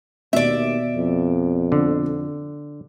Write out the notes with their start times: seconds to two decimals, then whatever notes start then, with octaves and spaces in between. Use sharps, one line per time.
0.33 D#2 B2 D5 E5
0.96 F2
1.72 D3